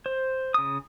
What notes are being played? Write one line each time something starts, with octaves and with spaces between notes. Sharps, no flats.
C5
C#3 D#6